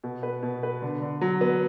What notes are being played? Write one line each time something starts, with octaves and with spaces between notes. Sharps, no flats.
B2
B4
B2
B4
D3
D3
F#3
B3